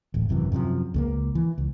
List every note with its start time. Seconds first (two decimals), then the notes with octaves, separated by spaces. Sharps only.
0.14 D1 A1
0.29 G#1 F#2 C3 E3
0.52 F#2 C3 D#3 F3
0.94 C#2 A3 A#3
1.35 E3
1.58 C#2